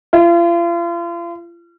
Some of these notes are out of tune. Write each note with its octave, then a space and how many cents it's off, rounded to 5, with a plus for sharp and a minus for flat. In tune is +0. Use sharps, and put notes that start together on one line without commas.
F4 -40